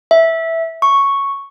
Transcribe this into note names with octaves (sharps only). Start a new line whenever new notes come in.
E5
C#6